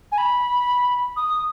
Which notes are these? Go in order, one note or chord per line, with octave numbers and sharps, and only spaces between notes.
G#5
B5
D#6